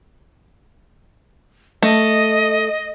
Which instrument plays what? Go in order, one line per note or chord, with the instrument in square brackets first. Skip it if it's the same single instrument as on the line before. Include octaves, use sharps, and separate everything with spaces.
[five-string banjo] A3 [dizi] D#5